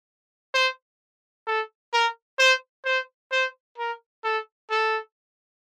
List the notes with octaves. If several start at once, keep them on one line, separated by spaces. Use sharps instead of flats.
C5
A4
A#4
C5
C5
C5
A#4
A4
A4